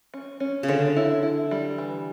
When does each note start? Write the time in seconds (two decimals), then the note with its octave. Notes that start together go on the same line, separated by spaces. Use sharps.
0.14 C#4
0.40 C#4
0.63 C#3
0.68 D3 C#5
0.96 E4
1.23 E4
1.51 G3
1.78 E3